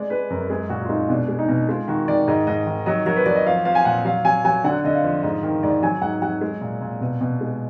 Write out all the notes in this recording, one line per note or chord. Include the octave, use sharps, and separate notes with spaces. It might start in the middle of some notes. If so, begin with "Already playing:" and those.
Already playing: G#3 D5
G#3 B4
F#2 A#4
G#3 G#4
A#2 F#4
F4
G#3 D#4
B2 D4
G#3
D#4
B2
G#3 F4
D#3 F#4
D#3 D5
G#2 D#5
G#2 D#5
D#3
F#3 D#5
F#3 A#4
B4
F#3 D5
D#5
F3 F5
F3 F5
G#5
A#2 F#5
F#3 F5
F#3 G#5
F#3 G#5
D3 F#5
D3 D#5
F5
F3
G#2 D#5
D#3 A#4
G#2 D5
F#3 G#5
G#2 F#5
F#3 F#5
G#3
A#2
A#2
B2
B2
G#3